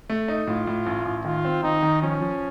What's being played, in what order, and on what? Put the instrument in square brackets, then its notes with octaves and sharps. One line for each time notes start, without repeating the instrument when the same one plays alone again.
[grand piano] A3
D#4
[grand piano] A2 [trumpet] F4
[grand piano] A2
A1
A1
[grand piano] D#3 [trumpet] F4
[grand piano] C4
[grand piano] D#3 [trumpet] D#4
[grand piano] D#3
[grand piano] F3 [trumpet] C#4
[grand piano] F3